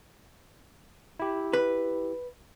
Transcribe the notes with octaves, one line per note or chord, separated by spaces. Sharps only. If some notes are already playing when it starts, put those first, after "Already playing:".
E4 G4
B4